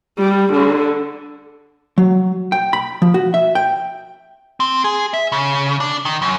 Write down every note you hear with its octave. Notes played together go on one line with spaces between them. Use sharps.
G3
D3
F#3
G5
B5
F3
F#4
E5
G5
C4
G#4
E5
C#3
D4
D#3
F#2